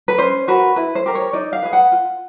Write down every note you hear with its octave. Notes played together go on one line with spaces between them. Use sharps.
B4
C#4 C5
F#4 A#4 B4
E4 B4
C5
G4 A#4
C#5
D#4 D5
F5
G#4 B4
F#5
F4